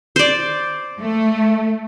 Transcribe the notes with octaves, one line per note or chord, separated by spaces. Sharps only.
C5 D5
A3